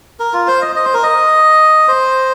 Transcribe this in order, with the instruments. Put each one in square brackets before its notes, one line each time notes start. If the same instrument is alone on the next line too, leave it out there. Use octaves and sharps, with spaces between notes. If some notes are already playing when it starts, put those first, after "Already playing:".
[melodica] A#4
F4
C5
D#5
D#5
C5
A#4
D#5
C5